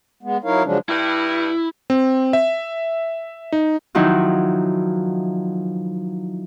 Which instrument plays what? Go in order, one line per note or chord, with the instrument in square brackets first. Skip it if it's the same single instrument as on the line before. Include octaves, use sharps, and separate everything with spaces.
[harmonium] G#3 B3
F#3 D#4 E4 A#4 C#5 F5
C#3 F3 F#3 G#3 C#4 D4
[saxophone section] G2 [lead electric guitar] E4
[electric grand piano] C4
E5
D#4
[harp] D#3 F3 F#3 D#4 E4